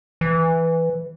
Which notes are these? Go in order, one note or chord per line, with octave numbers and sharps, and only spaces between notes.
E3